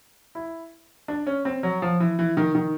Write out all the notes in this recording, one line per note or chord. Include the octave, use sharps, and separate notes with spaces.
E4
D4
C#4
C4
F#3
F3
E3
E3
D#3
D#3